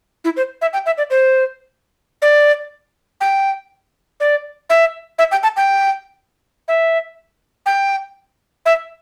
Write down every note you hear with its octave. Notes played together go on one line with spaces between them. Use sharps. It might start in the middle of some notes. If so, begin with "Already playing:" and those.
E4
C5
E5
G5
E5
D5
C5
D5
G5
D5
E5
E5
G5
A5
G5
E5
G5
E5